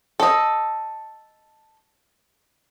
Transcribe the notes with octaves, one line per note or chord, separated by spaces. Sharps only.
A4 D#5